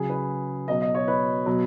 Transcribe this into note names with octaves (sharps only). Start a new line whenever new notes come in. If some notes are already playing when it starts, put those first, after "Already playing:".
Already playing: C#3 F#3 G#4
B4
B2 F#3 D#5
D#5
C#5
B4
B2 F#3